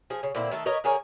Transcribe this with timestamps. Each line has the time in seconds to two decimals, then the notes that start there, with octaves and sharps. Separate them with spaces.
0.10 F3 G#4
0.23 C#3
0.35 A#2 D3 C4 E4
0.51 D#3 A3 A4
0.66 A#4 B4 C#5 D#5
0.84 D3 G#4 A#4 C#5